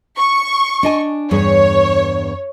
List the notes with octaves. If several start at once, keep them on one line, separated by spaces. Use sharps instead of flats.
C#6
D4 D#5 G#5
E2 G2 G#4 C#5